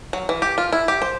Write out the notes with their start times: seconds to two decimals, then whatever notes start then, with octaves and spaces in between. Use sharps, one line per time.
0.13 F#3
0.29 E3
0.42 G4
0.58 F4
0.72 E4
0.88 G4
1.02 C5